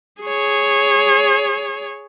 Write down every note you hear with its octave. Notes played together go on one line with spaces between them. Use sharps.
G#4 C#5